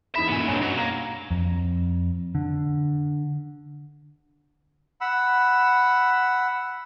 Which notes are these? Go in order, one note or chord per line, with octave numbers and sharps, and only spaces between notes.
E2 D#4 E5 B5
B1 F#2 A#2 B3 G#5
B1 G2 F#3 C4
F#3
A#3 G#6
F2
D3
F#5 B5 E6